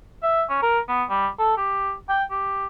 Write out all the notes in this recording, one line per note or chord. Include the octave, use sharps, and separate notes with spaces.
E5
C#4
A#4
B3
G3
A4
G4
G5
G4